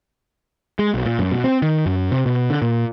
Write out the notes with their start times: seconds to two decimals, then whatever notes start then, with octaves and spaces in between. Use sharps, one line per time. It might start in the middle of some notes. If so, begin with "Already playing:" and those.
0.79 G#3
0.94 B1
1.06 A#2
1.19 F#2
1.32 B2
1.44 C4
1.62 D#3
1.86 F#2
2.12 C3
2.26 B2
2.50 D3
2.62 A#2